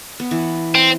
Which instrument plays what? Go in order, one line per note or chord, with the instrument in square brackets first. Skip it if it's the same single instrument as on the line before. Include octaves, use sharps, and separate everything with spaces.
[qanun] B3
E3
[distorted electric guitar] C4